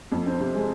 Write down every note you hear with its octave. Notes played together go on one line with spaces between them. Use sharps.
F2
C4
C3
G#3